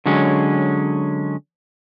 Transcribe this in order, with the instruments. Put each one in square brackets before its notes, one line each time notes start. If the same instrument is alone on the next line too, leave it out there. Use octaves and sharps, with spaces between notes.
[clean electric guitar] D3 F#3 G#3 C#4